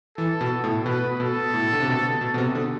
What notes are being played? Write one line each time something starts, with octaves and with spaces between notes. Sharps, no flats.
E3 A4
B2
A2
B2 B4
B2 A4
A2
D3
C3
B2
B2
B2
C3
D3